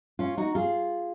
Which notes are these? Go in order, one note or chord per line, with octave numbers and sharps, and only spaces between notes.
C#4 F4
D#4 F#4
F4 G#4